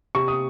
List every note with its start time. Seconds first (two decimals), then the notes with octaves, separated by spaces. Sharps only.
0.15 C3 C#6
0.28 D#6